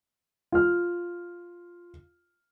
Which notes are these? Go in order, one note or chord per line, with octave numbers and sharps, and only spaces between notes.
F4 F6